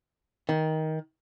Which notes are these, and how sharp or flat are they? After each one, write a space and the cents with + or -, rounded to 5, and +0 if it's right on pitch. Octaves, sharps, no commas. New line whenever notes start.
D#3 +15